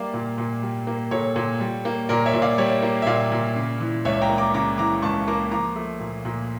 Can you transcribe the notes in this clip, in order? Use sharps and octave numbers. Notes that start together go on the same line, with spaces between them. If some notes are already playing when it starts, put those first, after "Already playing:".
Already playing: G3 A#3 D5 E5 F5
A#2
A#2
G3
A#3
A#2 A4 C#5
A#2
G3
A#3
A#2 A#4 D5
C#5 E5
A#2
D5 F5
G3 C#5 E5
A#3
E5
A#2 D5 F5
A#2
C#3
E3
C#2 C#5 E5
G5 A#5
A#3
A#5 D6
C#3 A#5 D6
E3 A#5 D6
C#2 A5 C#6
A#3 A#5 D6
F3 A#5 D6
A3
A#2
A#2